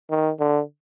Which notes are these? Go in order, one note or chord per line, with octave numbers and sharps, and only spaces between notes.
D#3
D3